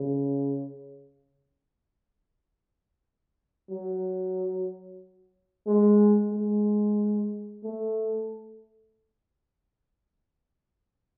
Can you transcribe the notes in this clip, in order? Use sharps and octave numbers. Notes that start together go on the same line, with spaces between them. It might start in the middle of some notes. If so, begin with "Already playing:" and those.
Already playing: C#3
F#3
G#3
G#3
A3